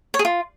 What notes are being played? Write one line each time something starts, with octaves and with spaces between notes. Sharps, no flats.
C#5
G#4
F4